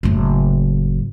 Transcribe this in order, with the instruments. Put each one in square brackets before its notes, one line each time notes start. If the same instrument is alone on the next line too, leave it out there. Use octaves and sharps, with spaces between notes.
[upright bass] F#1 A2